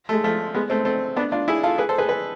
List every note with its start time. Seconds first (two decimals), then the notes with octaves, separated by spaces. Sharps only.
0.09 A3
0.13 G#3
0.24 F3 A3
0.55 G#3 B3
0.70 A3 C4
0.85 A3 C4
1.16 B3 D4
1.32 D4 F4
1.48 E4 G#4
1.63 F4 A4
1.78 G#4 B4
1.89 A4 C5
1.98 G#4 B4
2.09 G#4 B4